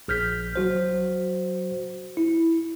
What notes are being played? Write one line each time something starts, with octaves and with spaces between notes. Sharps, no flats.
A#1 F6 G6 B6
F#3 F#4 C5
E4